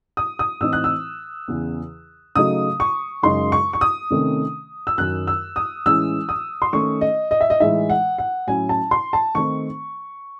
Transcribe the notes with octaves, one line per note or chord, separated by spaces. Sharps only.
D#6
D#6
A2 E3 C4 D#4 E6
F#6
E6
E2 C#3 E3
C#3 F#3 A3 D#4 D#6
C#6
F#2 C#3 G#3 D#4 C6
C#6
C#6
D#6
C3 D#3 A3 C#4
E6
F#2 D#3 F#3 F#6
E6
D#6
A2 E3 G#3 C#4 E6
D#6
C6
D#3 A3 C#4 C#6
D#5
D#5
E5
D#5
A2 E3 G#3 D#4 E5
F#5
F#5
A2 F#3 C#4 E4 G#5
A5
C6
A5
D#3 A3 C4 D#4 C#6